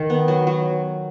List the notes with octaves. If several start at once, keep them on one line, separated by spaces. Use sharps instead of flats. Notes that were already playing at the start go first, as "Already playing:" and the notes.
Already playing: D#3
B3
F#3
F#3